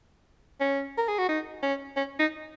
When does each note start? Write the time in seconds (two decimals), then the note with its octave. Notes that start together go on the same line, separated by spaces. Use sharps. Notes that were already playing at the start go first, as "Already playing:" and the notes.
0.61 C#4
0.98 A#4
1.08 G#4
1.19 F#4
1.29 D#4
1.63 C#4
1.96 C#4
2.19 D#4